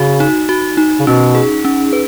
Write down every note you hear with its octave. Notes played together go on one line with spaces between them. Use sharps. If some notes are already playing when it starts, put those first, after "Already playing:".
Already playing: C#3 F#4
D#4
F#4
D#4
C#3
B2 C#4
G#4
C#4
B4